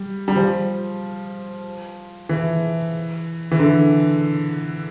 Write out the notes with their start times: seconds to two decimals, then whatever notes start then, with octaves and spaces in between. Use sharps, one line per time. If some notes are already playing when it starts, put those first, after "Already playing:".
Already playing: G3
0.28 G3
0.36 F3
2.29 E3
3.52 E3
3.60 D3